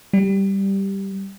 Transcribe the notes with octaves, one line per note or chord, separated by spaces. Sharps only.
G3